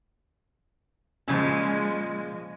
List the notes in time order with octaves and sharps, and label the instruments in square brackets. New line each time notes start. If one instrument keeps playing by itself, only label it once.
[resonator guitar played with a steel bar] A#2 C#3 F3 [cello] G#3 [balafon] C#4